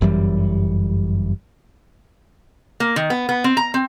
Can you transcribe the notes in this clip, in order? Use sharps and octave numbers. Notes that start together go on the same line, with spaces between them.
G1 F#2 E3 G3
A#3
D#3
B3
B3
C4
A#5
C4